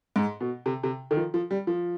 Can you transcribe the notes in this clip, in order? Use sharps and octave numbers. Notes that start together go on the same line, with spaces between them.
G#2
B2
C3
C3
D#3
F3
F3
G3
F3